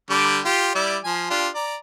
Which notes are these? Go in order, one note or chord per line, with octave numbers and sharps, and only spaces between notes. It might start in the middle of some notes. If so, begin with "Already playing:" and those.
D3 G3 D6
F4 G4
G3 E4 D5
F3 G#5
D4 F4 G4
D5 A#5